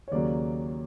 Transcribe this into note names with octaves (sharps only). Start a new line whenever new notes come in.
C#5
D#2 C#3 F#3 A#3 D5